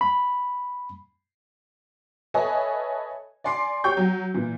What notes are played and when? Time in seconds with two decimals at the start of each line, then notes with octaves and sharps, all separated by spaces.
0.01 B5
2.34 A4 B4 C#5 D#5 E5 G#5
3.44 D5 G#5 C6 D6 C7
3.84 G4 C#5 G5 C#6 G6
3.97 F#3
4.34 A#2 E3